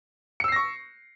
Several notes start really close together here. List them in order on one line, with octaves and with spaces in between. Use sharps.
C#7 E6 C7 A#6 C#6